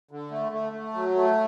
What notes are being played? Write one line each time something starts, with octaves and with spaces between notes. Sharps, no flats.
D3
A3
A3
A3
F#3
A3